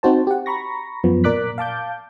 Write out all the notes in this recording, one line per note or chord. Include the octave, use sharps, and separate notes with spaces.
C4 D#4 F#4 C5 A5
G4 F#5
A#5 B5 C#6 A#6
F#2 F3 B3
A#2 A#4 D5 D6 F#6 B6
F5 A5 D6 G6